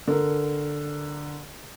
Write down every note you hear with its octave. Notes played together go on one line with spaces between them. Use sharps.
D3 A#4